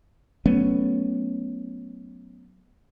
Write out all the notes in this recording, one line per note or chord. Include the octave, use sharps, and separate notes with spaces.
F#3 A3 B3 C#4